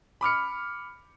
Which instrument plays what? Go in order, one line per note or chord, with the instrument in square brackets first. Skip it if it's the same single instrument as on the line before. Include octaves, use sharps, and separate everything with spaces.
[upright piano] B5 D6 F6 C#7